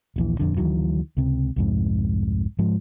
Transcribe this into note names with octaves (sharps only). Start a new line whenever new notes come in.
D#1 A#1 E3
D#1 A#1 F2 D3
D2 D#3 E3 F#3
C#2 C3
C2 F2 G#2
G#2 F3 G#3